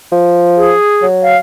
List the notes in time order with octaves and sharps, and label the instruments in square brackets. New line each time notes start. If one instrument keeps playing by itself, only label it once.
[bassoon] F3
[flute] G#4
[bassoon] F#3
[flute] F5